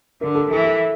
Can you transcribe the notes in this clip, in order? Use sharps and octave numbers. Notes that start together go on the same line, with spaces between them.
D3 A#4
A4
E3 A4
A4